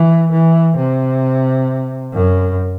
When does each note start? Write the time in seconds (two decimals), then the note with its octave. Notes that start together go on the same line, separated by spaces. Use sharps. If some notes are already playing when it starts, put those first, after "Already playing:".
Already playing: E3
0.32 E3
0.77 C3
2.13 F#2